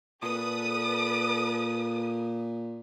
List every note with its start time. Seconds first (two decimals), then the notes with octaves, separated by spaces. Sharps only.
0.23 A#2 A4 B4 D#6